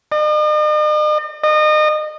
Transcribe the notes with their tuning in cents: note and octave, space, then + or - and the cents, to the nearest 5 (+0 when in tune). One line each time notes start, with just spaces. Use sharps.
D#5 -45
D#5 -30